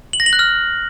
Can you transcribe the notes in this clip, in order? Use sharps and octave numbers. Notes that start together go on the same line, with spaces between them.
F#7
A#6
F#7
F#6
F6